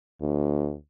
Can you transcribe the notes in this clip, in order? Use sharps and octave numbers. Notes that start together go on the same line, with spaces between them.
D2